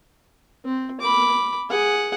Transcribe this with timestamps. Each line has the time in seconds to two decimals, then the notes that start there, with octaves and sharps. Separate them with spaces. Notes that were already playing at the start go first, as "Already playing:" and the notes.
0.65 C4
1.01 B5 D6
1.70 G#4 F#5